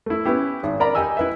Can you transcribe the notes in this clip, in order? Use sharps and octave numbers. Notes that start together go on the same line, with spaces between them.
A3 E4
B3 C#4 E4 G4
G#1
A#4 D5 A#5 B5
D#4 G4 D#5 G#5 E6
E4 B4 E5